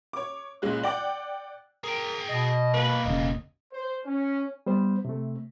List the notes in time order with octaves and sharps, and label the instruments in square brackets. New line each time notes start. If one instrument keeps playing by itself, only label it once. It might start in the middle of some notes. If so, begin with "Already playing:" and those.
[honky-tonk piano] C#5 D6
C#2 A#2 G#3 C#4 F#6
D5 F#5 G5 D6
[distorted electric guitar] G#4 G5 [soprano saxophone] A#4
[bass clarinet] B2 [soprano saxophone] D#5
[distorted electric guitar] B1 A#3 [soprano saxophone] B4
[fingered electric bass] E1 C#3 [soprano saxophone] D#5
[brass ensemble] C5
C#4
[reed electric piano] G3 B3 C5
C3 A3